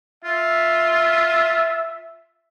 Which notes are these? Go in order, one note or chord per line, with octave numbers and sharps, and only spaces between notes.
F4 E5